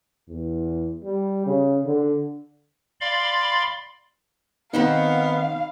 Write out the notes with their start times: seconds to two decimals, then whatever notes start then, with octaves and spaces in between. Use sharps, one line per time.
0.29 E2
1.04 G3
1.46 C#3
1.86 D3
3.01 D5 F5 B5 C6
4.73 D#3 B3 C4 D#4 F5 F#5 B5